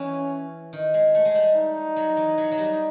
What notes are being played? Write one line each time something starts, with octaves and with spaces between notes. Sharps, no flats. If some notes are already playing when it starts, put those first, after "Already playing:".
Already playing: E3 C#4
D#3
G#3
A3
G#3
G3
D#4
F#3
E3
F#3
F#3
G3